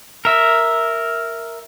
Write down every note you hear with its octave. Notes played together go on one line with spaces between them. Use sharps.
A#4 E5